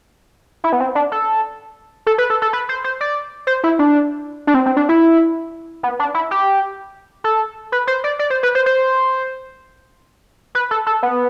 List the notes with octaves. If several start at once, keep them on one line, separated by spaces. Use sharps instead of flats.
E4
B3
C4
D4
A4
A4
B4
A4
A4
B4
C5
C5
D5
C5
E4
D4
D4
C4
C4
D4
E4
B3
D4
E4
G4
A4
B4
C5
D5
D5
C5
B4
C5
C5
B4
A4
A4
B3